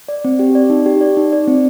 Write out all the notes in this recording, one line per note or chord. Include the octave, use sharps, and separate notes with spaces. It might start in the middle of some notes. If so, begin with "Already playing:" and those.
D5
C4
G4
D5
D#4
G4
D5
D#4
D5
C4